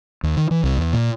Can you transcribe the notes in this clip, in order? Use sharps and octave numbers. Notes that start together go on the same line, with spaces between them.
D#2
D#3
E3
C2
E2
A#2